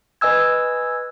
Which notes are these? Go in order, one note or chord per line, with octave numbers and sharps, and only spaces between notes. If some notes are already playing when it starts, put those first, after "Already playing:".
B4 D#5 G#5 E6 G#6